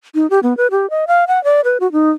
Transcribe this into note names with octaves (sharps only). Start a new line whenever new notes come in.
D#4
G4
B3
B4
G4
D#5
F5
F#5
D5
B4
F#4
D#4